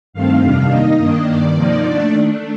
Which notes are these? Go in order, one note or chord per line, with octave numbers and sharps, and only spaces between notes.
G2 D#3 A3 C4 F5
F2 C3 D#3 G3 D4
D#3 A#3 D#4 D#5
G2 D#3 A#3 D4
G2 D#3 A#3 D5
C3 F3 A#3 D#4
D3 A3 D4
D#3 A3 D4